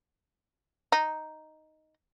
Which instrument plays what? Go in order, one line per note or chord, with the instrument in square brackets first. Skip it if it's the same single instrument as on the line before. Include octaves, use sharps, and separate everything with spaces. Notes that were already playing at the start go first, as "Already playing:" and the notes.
[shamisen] D#4